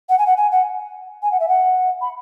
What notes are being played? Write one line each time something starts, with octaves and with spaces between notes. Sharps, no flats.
F#5
G#5
F#5
G#5
F#5
G#5
F#5
E5
F#5
B5